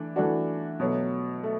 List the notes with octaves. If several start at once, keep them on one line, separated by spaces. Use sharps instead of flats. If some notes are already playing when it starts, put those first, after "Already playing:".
Already playing: E3 A3 D4
E3 A3 D4 F#4
B2 F#3 A3
A3